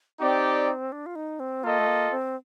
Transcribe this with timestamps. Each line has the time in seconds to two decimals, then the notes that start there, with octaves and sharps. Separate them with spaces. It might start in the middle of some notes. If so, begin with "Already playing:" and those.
0.20 C4 D#4 G4 D5 G5
0.92 D4
1.06 F4
1.15 D#4
1.40 C4
1.63 A#3 F4 A4 D#5
1.79 A3
1.87 A#3
2.11 C4